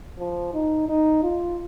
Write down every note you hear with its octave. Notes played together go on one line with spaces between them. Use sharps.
F3
D#4
D#4
F4